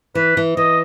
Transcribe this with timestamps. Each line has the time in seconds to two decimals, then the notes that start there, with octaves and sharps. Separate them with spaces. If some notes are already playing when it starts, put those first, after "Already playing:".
0.15 E3 B4
0.37 E3
0.57 E3 D#5